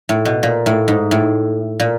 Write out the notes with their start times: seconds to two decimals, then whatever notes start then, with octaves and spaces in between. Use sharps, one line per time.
0.09 A2
0.25 B2
0.43 A#2
0.66 A2
0.88 G#2
1.11 A2
1.80 A#2